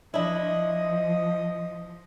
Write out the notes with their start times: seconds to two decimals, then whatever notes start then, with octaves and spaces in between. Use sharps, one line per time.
0.14 F3 D4 E4 D#5